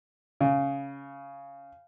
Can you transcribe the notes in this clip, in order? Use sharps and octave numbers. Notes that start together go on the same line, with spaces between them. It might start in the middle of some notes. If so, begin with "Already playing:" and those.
C#3